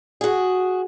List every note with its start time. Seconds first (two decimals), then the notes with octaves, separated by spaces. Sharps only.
0.21 F#4 G#4